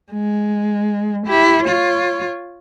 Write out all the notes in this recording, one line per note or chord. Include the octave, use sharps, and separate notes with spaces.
G#3
E4 G4
F4 C#5